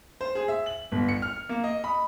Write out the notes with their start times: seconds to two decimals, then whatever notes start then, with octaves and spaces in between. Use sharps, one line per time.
0.21 C5
0.35 G#4
0.48 E5
0.66 F#7
0.92 G1
1.09 C#7
1.22 F6
1.49 A#3
1.64 D#5
1.84 B5